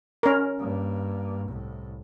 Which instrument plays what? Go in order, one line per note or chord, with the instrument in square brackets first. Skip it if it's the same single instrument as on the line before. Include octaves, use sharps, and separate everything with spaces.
[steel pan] C#4 A#4
[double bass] G2 A#3
C2 A2